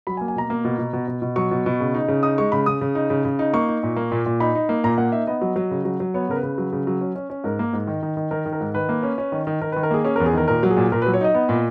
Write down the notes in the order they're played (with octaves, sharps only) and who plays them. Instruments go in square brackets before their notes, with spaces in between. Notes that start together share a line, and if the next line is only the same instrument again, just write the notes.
[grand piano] F#3 B5
G#5
A#3
G#5
B2 A#5
A#3
B2
B2
B2
B2
B2
F#3 C#6
B2
B2
C#3
D#4
C#3
D#4 D#6
G#3 C#6
C#3 B5
C#3 D#6
C#3
D#4
C#3
C#3
D#4
A#3 C#6
D#4
A#2
A#3
A#2
A#2
D#4 B5
D#4
A#3
A#2 A#5
A#3 F#5
D#4 E5
B3 D#5
F#3
F#3
C#3
F#3
F#3
B3 C#5
C#3 A#4
B4
C#3
F#3
C#3
F#3
C#4
C#4
C#4
G#2 A#4
A#3
G#2
D#3
D#3
D#3
D#3 A#4
D#3
A#4
G#2
D#3 B4
A#3
C#4
C#4
D#3
D#3
D#3 A#4
B4
D#3
A#4
A#3 G#4
C#4 G#4
A#4
E2
G#4
D#3 A#4
A#2 A#4
F#3
G#4
A#2
A#2 A#4
B4
F#3
C#5
D#4 D#5
B3
A#2